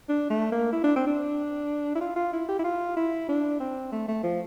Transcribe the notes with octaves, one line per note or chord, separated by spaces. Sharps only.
D4
A3
A#3
E4
D4
C4
D4
E4
F4
F4
E4
G4
E4
F4
E4
D4
C4
A3
A3
F3